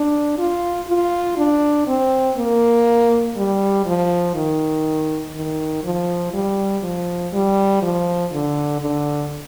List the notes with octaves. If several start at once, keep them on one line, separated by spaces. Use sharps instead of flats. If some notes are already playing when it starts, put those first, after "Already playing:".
Already playing: D4
F4
F4
D4
C4
A#3
G3
F3
D#3
D#3
F3
G3
F3
G3
F3
D3
D3